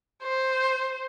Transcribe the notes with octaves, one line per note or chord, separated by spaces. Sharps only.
C5